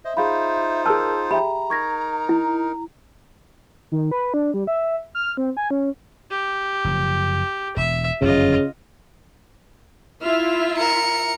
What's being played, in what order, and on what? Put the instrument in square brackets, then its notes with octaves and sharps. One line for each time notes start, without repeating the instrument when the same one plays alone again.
[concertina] C5 D#5 [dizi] E5
[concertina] D#4 F4 C5 [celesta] G#4 F5 B5
[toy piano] G#4 A5 [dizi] A#4 [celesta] E6 F6
[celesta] G4 E5 G5 [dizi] A#5 [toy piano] B5
[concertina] D#4 A#4 [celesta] C#6 G#6 A#6
[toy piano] E4
[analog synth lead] D#3
B4
D4
G3
E5
F6
C4
G#5
C#4
[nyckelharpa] G4
[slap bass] F#1 F3
[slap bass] E1 [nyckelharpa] E5
[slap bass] G1 F#2 E3 [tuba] C#3 [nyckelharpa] F4 D#5
[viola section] E4 F4 E5 [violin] F6
[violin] A#4 C#7